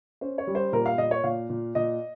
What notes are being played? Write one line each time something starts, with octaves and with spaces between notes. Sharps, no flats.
C#4 C5
C#5
G3
C5
A#2 A#4
F5
A#2 D#5
C#5
A#2 F5
A#2
A#2 D#5